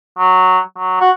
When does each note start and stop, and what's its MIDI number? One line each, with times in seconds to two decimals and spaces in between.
0.19 0.59 54
0.78 0.97 54
1.01 1.11 66